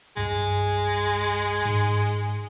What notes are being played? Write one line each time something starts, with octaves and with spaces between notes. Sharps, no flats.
C2 G2 G#3
G#2